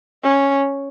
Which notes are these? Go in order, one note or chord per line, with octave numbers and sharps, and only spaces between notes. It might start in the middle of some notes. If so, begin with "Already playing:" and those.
C#4